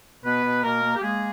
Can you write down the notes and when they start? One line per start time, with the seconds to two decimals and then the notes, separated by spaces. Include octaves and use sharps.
0.24 B2 B3 B4
0.43 B2
0.63 B2 A#3 A#4
0.83 A#3
0.96 G4
1.03 G#3 A#3 G#4